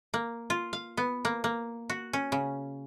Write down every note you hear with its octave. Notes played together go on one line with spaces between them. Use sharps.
A#3
F4
F5
B3
A#3
A#3
F#4
C#4
C#3